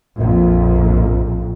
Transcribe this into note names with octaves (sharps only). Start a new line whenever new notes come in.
A#1 F2